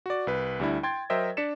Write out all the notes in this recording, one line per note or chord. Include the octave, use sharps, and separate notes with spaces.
F#4 D5
C2 B4
D2 G3 D4 E4
G5 C6 G#6 A6
F#3 A#4 C5 D#5 E5 G5
D4 D5 B6 C#7 E7